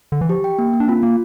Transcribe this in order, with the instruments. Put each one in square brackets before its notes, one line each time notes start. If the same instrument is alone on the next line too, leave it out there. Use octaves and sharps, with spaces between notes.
[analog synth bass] D3
E3
[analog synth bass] F3 [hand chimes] G4
[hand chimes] G5
A#3
A#3
[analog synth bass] D4
[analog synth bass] C4 [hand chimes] F4
[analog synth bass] A#3 [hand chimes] F4